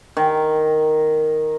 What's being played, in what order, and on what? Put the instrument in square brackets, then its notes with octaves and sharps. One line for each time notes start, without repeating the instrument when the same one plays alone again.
[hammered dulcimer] D#3